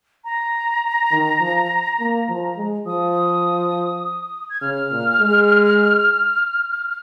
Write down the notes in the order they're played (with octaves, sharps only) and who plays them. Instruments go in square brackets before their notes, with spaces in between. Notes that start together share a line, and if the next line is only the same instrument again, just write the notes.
[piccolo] A#5
[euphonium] D#3
F3
A#3
F3
G#3
[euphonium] F3 [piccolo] D#6
[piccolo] G#6
[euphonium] C#3 [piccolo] F6
[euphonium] A#2
G#3